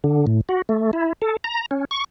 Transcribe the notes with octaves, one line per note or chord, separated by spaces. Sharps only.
D3
A2
F#4
A3
E4
A4
A#5
C#4
C#6